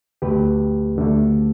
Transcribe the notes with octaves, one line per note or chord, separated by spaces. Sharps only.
D2 D3 A3 G4 B4
D2 D3 A3